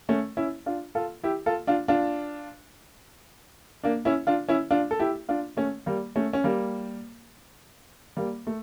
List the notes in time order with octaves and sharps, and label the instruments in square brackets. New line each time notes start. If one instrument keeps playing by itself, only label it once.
[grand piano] A3 C#4
C#4 E4
D4 F4
F4 A4
E4 G4
F4 A4
D4 F4
D4 F4
A#3 D4
C#4 E4
D4 F4
C#4 E4
D4 F4
A4
E4 G4
D4 F4
A3 C#4
G3 A#3
A3 C#4
C#4
G3 A#3
G3 A#3
A3